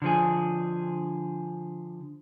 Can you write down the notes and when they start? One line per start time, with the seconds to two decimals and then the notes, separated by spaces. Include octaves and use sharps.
0.02 D3 F3 G#4